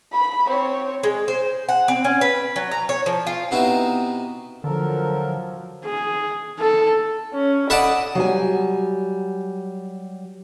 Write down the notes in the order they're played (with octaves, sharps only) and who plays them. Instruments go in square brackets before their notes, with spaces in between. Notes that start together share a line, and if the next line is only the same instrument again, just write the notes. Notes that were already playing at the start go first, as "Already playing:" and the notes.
[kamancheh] B5
C4 C#5
[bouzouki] G#3
C5
F#5
C4
C#4
B4
F#3
A#5
C#5
F3
F4
[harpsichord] C3 B3 D#4 E4 F#4
[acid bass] D3 [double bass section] F3 F#3 [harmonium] A4 A#4
[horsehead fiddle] G#4
A4
[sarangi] C#4
[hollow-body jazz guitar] A4 D5 [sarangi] D#5 [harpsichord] F#5 A5 B5
[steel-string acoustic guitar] F#3 G3 G#5